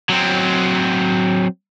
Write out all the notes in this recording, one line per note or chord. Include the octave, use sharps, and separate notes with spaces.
F#3 C4